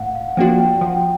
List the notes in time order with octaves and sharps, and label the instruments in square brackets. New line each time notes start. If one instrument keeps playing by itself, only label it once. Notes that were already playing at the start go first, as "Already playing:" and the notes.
Already playing: [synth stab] A2 [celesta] F5 F#5
[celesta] F5
F#5
[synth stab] F3 A#3 D4 F#4 [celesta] G5
[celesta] G5
[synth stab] F3 [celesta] F#5
[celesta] G5